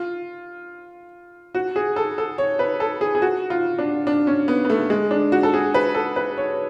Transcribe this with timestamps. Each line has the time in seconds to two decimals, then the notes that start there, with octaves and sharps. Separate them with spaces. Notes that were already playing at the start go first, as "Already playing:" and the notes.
Already playing: F4
1.55 F#4
1.76 G#4
1.96 A4
2.18 A4
2.38 C#5
2.59 B4
2.80 A4
3.01 G#4
3.15 G#4
3.22 F#4
3.50 F4
3.78 D4
4.07 D4
4.27 C#4
4.48 B3
4.65 B3
4.70 A3
4.90 G#3
5.11 D4
5.32 F#4
5.43 A4
5.54 G#4
5.74 B4
5.95 A4
6.16 B4
6.37 C#5